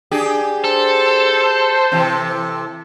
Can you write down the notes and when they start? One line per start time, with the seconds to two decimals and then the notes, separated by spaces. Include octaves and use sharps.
0.11 D4 G4 G#4
0.64 A4 C5
1.92 C3 E3 C4